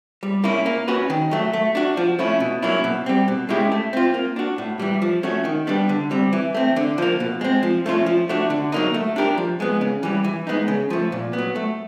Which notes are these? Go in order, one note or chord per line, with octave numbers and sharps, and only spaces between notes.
G3
A#3 C#4 E4
A#3
C#4 F#4 B4
D#3
F#3 A3
A3
D4 F#4
F3
A3 C#4 E4
B2
F#3 A#3 C#4 E4
B2
G3 C4
B2
G#3 C#4 E4 G4
A3
C4 F4
A#3
D4 F#4
A2
E3 G3
F3
A3 C#4 F#4
D#3
G3 B3 D4
D3
G3 C4
E3
A3 C4
D3
F3 A#3
B2
G#3 C4
F3
A3 C#4 F4
F3
A3 D4 F#4
D3
F#3 A#3 D#4
A3
D4 G4 A#4
F3
G#3 B3
C#3
E3 G3
E3
G#3 B3 D#4
C#3
F3 A3
A#2
B3
F#3
A3